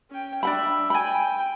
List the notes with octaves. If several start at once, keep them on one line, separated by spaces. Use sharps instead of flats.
C#4 G5
D4 E5 G5 B5
G5 G#5 B5